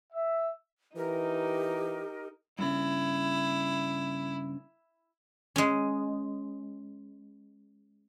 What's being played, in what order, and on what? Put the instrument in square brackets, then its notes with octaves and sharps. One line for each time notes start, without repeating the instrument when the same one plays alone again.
[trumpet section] E5
[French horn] E3 [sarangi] D#4 [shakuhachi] G4 [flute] A#4
[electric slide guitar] G2 C#3 [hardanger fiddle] E4
[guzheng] G#3 C#4